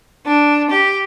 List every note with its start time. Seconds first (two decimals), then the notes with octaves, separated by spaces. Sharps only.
0.25 D4
0.69 G4